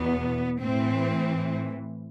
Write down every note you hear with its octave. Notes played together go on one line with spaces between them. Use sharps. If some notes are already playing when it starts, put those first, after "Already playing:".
Already playing: E2 B2 B3
A2 E3 C4